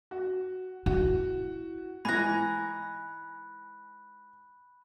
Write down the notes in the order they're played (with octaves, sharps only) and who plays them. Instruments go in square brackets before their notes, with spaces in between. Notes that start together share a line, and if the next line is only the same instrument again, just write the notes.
[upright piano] F#4
[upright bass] E4 [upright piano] F#4
[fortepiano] G#2 E3 [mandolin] G#5 A#5 [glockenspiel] B5 F#6